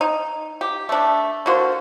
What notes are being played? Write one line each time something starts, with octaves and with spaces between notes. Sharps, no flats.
D#4
G4
A3 D4
D3 A#3 F#4 C5